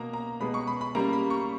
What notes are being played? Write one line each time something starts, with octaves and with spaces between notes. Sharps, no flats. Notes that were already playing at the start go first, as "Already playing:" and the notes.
Already playing: B2 A#3 A#5
A#5
B2 G#3 B3 B5
C#6
B5
B5
C#3 G3 A#3 A#5
B5
C#6